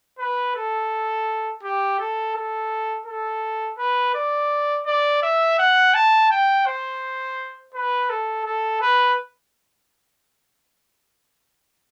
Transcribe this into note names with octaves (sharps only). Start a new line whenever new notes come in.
B4
A4
G4
A4
A4
A4
B4
D5
D5
E5
F#5
A5
G5
C5
B4
A4
A4
B4